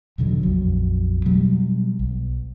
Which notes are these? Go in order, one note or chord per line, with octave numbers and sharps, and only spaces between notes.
E2 B2 D3 F#3
A#1 F2 F#3
B2 F#3 G3
B1